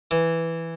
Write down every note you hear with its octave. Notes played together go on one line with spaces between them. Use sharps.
E3